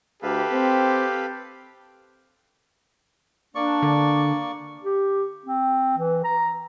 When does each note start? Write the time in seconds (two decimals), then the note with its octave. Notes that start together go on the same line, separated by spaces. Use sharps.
0.23 D2 G4 A4 B4 F5
0.52 C4
3.55 A#3 D4 D5 C#6
3.82 D3
4.83 G4
5.45 C4
5.97 E3
6.24 A#5